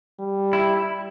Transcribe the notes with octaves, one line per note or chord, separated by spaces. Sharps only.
G3
E4